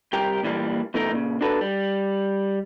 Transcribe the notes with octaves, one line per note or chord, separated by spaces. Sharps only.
C2 G4 A#4 G5
A#2 D3 E3 G3 A#3
B2 E3 A3 D#4 A#4
A#2 C#3
D4 F#4 A4 B4
G3